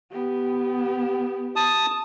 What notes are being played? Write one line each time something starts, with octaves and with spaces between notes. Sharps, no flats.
B3 G4
A5 D#6